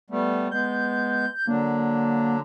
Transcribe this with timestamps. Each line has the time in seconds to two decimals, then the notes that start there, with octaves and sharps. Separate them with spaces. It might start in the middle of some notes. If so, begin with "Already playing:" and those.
0.10 G3 A3 B3
0.51 G#3 B3 G6
1.47 D3 F#3 A#3 D4